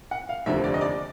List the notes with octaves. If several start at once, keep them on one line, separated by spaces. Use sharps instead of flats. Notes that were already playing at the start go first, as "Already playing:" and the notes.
F#5
F5
F1 D#2 D3 F3 E5
D5
D#5
D5